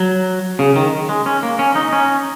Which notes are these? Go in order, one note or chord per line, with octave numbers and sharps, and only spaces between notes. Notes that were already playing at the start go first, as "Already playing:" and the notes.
Already playing: F#3
C#3
D#3
G#3
C#4
A#3
C#4
D#4
C#4